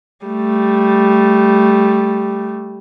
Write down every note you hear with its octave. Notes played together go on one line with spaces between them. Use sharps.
G3 A3